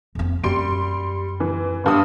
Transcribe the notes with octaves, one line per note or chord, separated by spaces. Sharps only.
F2 C4
F#2 G3 C6 D7
E3
G1 G2 D#6